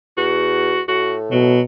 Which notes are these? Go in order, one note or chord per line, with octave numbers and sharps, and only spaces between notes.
E2 F#4
A2 F#4
B2 F#3